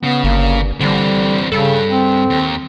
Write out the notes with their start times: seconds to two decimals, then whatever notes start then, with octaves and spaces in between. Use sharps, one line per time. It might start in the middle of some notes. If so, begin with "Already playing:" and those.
0.03 C#3 B3
0.24 G1 A#3
0.81 D3 E3 G3 C4
1.52 G2 C#3 G3 A4
1.90 C4
2.30 D#2